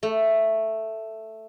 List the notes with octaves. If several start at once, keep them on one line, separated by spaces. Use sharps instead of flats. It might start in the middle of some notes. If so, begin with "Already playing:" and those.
A3